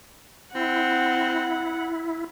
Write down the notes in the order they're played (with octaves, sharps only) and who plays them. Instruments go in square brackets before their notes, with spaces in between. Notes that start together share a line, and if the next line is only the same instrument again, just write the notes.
[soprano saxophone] C4 [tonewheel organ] E4 [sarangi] F#5